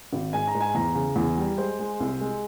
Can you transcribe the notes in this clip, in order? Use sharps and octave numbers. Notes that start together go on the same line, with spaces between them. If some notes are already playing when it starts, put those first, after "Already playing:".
G#1
G#2 G#5
A#5
G#2
G#5
E2 A#5
C#3
E2
G3
G#3 C5
G#3
C2
G#3